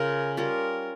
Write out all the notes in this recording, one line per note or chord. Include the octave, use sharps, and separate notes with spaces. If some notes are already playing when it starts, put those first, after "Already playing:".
Already playing: C#3 C#4 F4 A#4
G3 C#4 F4 A#4